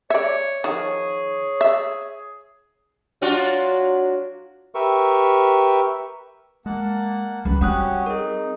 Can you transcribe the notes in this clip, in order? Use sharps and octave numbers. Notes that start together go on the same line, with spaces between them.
C#5 D5 E5
D#3 F3 G#4 C#5
E5
F#3 D4 F4 F#4
G4 A#4 B4 E5 C#6
G#3 A#3 F#5 A5
C#2 D#3 G3 B4
C4 C#4 F#4 G4 F#5 D#6 F#6
D#4 G#4 A#4